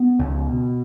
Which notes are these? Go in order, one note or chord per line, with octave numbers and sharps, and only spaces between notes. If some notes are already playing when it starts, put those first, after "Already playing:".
Already playing: B3
C#2
B2